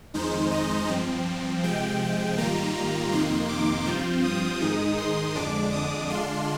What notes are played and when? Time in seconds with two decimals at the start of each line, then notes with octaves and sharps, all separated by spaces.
0.14 F2 D#3 G#3 D#4 C5
0.51 D#5
0.89 G2 F3 C4
1.63 C3 F3 G#3 G5
2.38 G#2 D#3 G3 A#3 F4 A#5
3.12 F2 C3 D#3 A#3 D#4 C6
3.49 D6
3.86 G2 F3 C4 F4 G6
4.24 D#6
4.61 G#2 D#3 G#3 D#4
4.98 C6
5.35 F2 D3 G#3 D4 D6
5.72 D#6
6.10 D3 G#3 D4 F4 C6